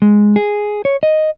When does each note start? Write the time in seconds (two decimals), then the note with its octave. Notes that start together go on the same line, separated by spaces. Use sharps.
0.02 G#3
0.36 G#4
0.85 C#5
1.03 D#5